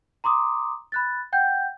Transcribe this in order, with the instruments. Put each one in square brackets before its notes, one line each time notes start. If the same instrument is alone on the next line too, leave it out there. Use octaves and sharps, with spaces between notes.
[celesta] A#5 C6 D6 D#6
B5 F#6 A6
F#5 G5 G6